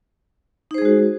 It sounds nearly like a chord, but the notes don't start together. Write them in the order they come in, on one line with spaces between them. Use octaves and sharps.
D#4 C5 G#4 G#3 F#4